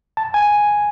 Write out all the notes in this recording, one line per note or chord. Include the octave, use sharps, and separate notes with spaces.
A5
G#5